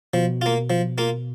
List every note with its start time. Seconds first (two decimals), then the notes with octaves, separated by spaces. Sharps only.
0.13 B2 F3
0.41 A#3 F4
0.70 F3
0.98 A#3 F4